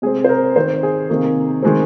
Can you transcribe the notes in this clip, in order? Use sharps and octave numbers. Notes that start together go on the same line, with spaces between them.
C3 G#3 C4 G#4
C5
A#4
D#3 C4 C5
G#4
C3 D#3 A#3
D#3 G#3 C4